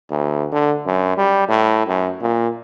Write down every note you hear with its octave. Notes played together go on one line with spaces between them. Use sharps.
D2
D3
F#2
G3
A2
F#2
A#2